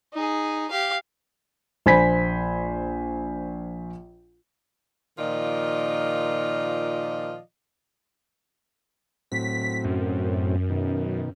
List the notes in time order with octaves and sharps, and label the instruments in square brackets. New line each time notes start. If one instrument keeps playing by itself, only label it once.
[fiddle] D#4 G#4
G4 F5
[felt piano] A#1 C5 G#5 B5 B6
[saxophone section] A#2 D#3 F3 F4 D5 D#5
[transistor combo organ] A2 F#3 C4 [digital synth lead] B6
[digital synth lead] F#2
[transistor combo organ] B2 D#3